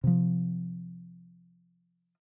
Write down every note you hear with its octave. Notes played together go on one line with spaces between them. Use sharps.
C3 F3